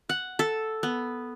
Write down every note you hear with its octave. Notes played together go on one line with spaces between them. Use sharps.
F#5
A4
B3